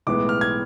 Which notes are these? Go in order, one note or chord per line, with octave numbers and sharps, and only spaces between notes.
B1 A2 E3 G#3 B3 D6
F6
G#6